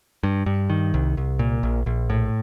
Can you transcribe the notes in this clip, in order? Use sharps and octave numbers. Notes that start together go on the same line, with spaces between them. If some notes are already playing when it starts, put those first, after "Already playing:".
G2
G2
D#3
C2
C2
A#2
A#1
A#1
A2